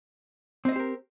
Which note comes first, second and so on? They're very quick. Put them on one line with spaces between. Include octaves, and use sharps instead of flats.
C4 D#5 C5 G4 A#4